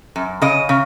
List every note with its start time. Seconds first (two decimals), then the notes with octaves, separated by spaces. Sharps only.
0.16 F#2
0.42 C#3 D#5
0.69 C#3